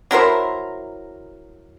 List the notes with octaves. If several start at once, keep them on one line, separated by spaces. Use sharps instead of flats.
F#3 E4 A#4 C5